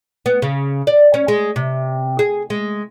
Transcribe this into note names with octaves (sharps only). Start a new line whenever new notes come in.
B3
C#3
D5
C#4
G#3
C3
G#4
G#3